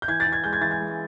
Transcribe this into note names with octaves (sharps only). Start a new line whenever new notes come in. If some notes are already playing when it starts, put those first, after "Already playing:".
G6
E3 G#6
A6
E3
G#6
G#3 G6
G#6
E3 A6
G#6
G#3